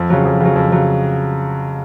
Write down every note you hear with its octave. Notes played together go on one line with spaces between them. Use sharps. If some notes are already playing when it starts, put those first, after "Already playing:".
Already playing: F2
C#3 F#3
F2
C#3 F#3
F2
C#3 F#3